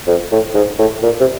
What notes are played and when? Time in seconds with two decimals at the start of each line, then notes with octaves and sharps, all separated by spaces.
0.07 F2
0.32 A2
0.54 G#2
0.79 A2
1.03 A#2
1.20 C3